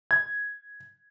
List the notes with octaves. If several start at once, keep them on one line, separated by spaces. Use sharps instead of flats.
G#6